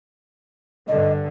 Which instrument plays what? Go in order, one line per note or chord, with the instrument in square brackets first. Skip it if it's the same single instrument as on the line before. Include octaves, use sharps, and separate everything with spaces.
[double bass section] G2 D3 [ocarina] D#5